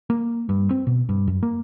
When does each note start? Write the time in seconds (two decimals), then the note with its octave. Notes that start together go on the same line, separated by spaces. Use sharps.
0.10 A#3
0.49 G2
0.71 C4
0.87 B2
1.09 G2
1.28 F#2
1.43 A#3